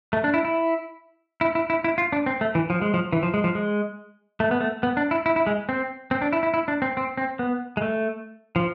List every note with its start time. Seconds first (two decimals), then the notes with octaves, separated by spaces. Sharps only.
0.13 A3
0.24 D4
0.34 E4
0.45 E4
1.41 E4
1.55 E4
1.70 E4
1.84 E4
1.98 F4
2.12 D4
2.26 C4
2.41 A3
2.55 E3
2.70 F3
2.82 G#3
2.94 F3
3.13 E3
3.23 F3
3.34 G#3
3.44 F3
3.55 G#3
4.40 A3
4.51 B3
4.61 A3
4.83 B3
4.97 D4
5.11 E4
5.26 E4
5.36 E4
5.47 G#3
5.69 C4
6.11 C4
6.22 D4
6.33 E4
6.43 E4
6.54 E4
6.68 D4
6.82 C4
6.97 C4
7.17 C4
7.39 B3
7.77 G#3
7.82 A3
8.56 F3